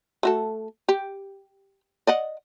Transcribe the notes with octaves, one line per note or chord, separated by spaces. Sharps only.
A3 F#4 A4
G4
D5 D#5 F#5